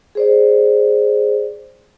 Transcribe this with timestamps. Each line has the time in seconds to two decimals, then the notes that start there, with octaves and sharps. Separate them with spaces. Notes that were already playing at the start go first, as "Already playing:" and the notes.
0.15 G#4 C5 D5